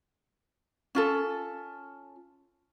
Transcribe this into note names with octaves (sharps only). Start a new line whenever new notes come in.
C#4 F4 A4